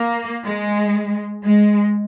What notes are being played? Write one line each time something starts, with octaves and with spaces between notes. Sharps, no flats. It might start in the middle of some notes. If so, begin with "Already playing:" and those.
Already playing: A#3
G#3
G#3